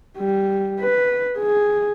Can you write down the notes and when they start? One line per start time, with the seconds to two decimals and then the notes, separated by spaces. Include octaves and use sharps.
0.17 G3
0.80 B4
1.38 G#4